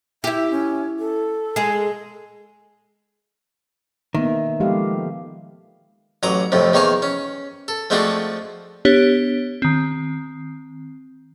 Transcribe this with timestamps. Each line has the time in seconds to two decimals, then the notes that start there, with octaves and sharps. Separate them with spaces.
0.24 E4 G4 E5
0.51 C#4
0.99 A4
1.56 G#3 G#4
4.15 D#3 A#3 B3 E5
4.60 F3 G#3 A3 B3 G4 F5
6.23 A1 F#3 A#5 D6 D#6
6.52 F2 A2 C3 F3
6.74 E2 D#3 A#3 C#5 G#5
7.02 C#4
7.68 A4
7.90 F3 G#3 A3 C4 D4 F#4
8.85 B3 D4 G4 C#5
9.62 D#3 C4